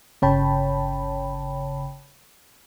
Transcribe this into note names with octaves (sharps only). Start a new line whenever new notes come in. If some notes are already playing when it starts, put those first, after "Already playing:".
G1 C#3 C#5 G5 A5 B5